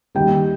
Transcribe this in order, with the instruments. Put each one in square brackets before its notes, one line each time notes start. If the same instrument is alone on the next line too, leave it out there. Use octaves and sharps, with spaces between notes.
[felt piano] D#2 D#3 G3 G5